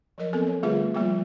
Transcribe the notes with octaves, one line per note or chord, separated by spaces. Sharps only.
F3 F#3 A#4 D#5
B3 C4 A4 A#4
C#5
D3 G3 A3 F4 G#4 B4
F3 G3 A#3 F4